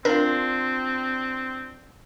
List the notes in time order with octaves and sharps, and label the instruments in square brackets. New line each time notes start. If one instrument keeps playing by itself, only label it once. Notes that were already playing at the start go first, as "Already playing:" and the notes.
[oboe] C4 [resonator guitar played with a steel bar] D4 F4 [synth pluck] A#4